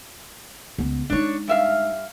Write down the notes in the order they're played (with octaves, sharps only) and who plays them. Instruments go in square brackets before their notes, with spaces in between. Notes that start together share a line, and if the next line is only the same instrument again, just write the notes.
[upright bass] C#2 B3
[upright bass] G#3 D#4 [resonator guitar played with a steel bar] D4 C#5
[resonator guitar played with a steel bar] G2 E5 F5